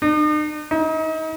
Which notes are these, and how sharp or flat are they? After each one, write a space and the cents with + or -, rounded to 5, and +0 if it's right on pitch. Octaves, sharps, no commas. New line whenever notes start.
D#4 -45
D#4 +35